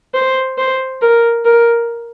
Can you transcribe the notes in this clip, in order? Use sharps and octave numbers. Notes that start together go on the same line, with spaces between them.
C5
C5
A#4
A#4